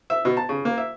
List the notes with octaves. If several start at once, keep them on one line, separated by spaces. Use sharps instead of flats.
E5
B2
A5
C#3
A#3
E5